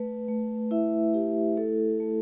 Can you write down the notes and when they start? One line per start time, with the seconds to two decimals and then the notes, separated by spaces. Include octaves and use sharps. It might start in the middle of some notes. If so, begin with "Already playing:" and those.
Already playing: A3 B4
0.28 A3
0.71 E4 E5
1.14 E4 G4
1.57 A3 A4
2.00 A3